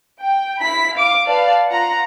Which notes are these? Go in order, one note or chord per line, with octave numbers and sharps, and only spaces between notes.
G5
E4 B5 B6
F5 D6
B4 D5 F5 A5
F4 F#5 A#5